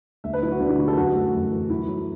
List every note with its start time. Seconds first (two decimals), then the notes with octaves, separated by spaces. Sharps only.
0.24 D2 E5
0.33 B4
0.42 F#3 E4
0.51 F#4
0.60 D2 D4
0.69 E4
0.79 D3 F#4
0.88 A4
0.97 F#2 F#4
1.15 A3
1.33 F#2
1.52 E3
1.70 F#2 E4
1.88 F#3